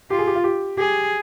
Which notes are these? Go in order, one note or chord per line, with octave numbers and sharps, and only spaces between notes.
F4 G4
G#4
G4
F4
G4
G4 G#4